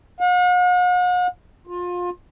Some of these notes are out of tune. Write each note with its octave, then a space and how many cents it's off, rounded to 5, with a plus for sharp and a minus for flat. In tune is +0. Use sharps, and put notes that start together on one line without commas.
F#5 -45
F4 +25